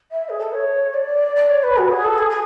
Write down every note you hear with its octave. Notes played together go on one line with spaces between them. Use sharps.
E5
G#4
A4
C#5
D5
D5
C#5
B4
F#4
G#4
A4
G#4
G#4